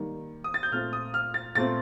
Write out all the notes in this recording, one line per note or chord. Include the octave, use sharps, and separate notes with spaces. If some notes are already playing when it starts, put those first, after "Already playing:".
Already playing: D#3 G3 A#3
D#6
A6
G6
A#2 A3 C4 F6
D#6
F6
A6
A#2 A3 C4 A6